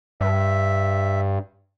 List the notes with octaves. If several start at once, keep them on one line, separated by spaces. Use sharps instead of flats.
G2 E5